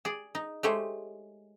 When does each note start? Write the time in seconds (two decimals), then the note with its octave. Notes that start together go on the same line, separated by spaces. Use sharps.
0.05 G#4 D5
0.35 D#4
0.63 G#3 A3 G4 C5 C#5